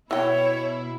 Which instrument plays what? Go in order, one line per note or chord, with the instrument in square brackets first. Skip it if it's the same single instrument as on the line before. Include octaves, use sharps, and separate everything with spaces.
[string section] B2 E4 [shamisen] E3 G5 [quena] C#5